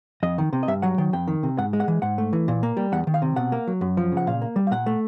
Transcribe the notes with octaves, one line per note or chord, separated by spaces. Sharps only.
F2 D#5
D#3
C3
D#5
G2 E5
F#3 F#5
D#3 G5
F2 G5
D#3
C3
G#2 F#5
G#3
F#5
E3
G#2 F#5
A3
E3
A#2
A#3
G3
E2 F#5
D#3
F5
C3
B2 F#5
A#3
F#3
F#2
F3
C#3
F#5
A#2 F5
A#3
G3
F5
A#2 F#5
A3